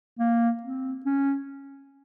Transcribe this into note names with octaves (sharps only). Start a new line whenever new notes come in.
A#3
C4
C#4